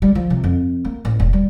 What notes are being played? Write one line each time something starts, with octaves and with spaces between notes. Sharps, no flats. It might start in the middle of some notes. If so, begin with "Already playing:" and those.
G3
F3
C3
F2
A#3
A1
E1
G3